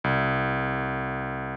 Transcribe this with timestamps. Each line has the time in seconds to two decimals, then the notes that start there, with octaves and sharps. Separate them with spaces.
0.04 C2